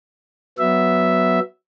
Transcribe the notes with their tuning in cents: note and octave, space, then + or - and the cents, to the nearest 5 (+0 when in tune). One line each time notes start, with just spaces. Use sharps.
F#3 +0 B3 +0 E5 +0